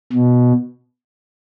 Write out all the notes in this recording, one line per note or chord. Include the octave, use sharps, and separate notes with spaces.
B2